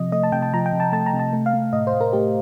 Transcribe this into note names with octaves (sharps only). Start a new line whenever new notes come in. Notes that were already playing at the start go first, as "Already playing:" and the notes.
Already playing: C3 F3 D#5
A3 D#5
A5
C3 G5
A5
F3 A#5
G5
C3
A5
A3 A5
A#5
C3
A5
A3
F5
A3
A2 D#5
C5
A2
A#4
A3 G4